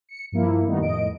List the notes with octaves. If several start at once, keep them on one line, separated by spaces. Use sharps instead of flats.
C#7
G2 F3 A#3 E4
D#3 G3 A3 B3 D#4
F2 A2 D#5 D7